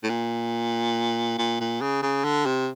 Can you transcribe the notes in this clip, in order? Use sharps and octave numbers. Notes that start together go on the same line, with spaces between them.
A2
A#2
A#2
A#2
C#3
C#3
D3
C3